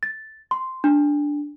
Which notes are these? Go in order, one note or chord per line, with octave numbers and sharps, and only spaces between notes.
A6
C6
D4